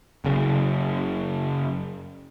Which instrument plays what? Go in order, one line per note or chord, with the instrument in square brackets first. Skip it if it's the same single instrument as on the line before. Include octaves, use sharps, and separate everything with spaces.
[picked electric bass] F#1 C#3